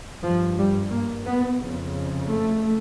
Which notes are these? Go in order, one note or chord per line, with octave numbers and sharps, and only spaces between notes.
G2 F3
G3
A#3
B3
F2 C#3
A3